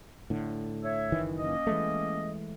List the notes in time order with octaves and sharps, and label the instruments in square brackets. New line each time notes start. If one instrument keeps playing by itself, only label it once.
[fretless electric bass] A2 D3
[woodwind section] C#5 E5
[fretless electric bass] F#1 D#3 E3
[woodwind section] A#3 C#4 D#5
[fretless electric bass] E3 G#3 A3